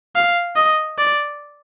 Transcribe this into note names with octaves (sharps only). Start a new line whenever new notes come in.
F5
D#5
D5